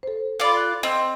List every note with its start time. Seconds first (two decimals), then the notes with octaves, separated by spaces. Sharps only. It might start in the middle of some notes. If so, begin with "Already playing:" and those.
0.03 A4 C5
0.40 F4 A4 D5 B5
0.57 F#6
0.83 C4 D#5